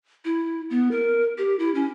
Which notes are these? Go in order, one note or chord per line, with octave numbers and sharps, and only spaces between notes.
E4
B3
A#4
G4
E4
C#4